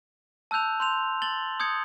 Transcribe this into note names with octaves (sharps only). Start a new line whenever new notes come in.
A5 E6 F#6 G6 F7
C6 G6 F7
A6 F#7 G7
D#6 G6 G#6 C#7